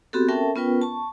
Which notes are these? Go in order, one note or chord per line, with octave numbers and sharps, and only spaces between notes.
B3 C4 F#4 G4 A4
C#4 A4 A#4 E5 G5 A5
B3 C#4 F4 A#4 B4 G5
A5 C#6